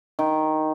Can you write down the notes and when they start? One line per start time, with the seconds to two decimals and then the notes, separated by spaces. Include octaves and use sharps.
0.19 D#3